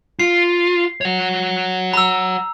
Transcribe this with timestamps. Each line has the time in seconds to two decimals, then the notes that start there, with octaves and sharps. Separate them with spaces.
0.19 F4 C7
1.01 C#5 F#5
1.94 A#5 E6